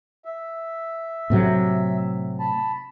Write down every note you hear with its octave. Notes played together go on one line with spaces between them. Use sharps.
E5
A2 C3 F#3
A5 B5